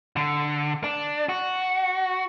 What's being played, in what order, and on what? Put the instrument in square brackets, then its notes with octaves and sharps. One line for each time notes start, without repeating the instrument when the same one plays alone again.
[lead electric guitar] D3
D4
F#4